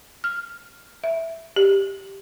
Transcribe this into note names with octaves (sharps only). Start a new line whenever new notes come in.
F6
E5
G4